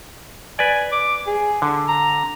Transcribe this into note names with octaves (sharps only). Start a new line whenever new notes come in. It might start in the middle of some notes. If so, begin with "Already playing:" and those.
B4 D5 G#5
D6
G#4
D3
A#5